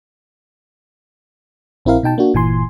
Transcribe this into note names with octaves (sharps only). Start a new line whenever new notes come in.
A#1 C4 E4 A#4 F5
B2 D#4 G5 A5
A#3 D4 F#4
G1 A#2 E3 G#5 C6